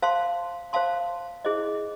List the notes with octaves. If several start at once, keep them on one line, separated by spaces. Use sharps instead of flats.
C5 F5 A5 C6
C5 F5 A5 C6
E4 G#4 C5 D#5